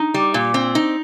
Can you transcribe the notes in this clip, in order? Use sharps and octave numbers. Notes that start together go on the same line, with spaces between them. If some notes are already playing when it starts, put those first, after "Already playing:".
Already playing: D#4
G3
A#2
C4
D#4